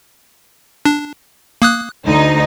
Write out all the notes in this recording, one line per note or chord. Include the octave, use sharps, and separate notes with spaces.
D4
A#3 D#6 F#6
D2 D#4